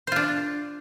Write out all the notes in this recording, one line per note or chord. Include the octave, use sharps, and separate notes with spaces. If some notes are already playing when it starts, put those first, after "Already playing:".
D4 F4 C5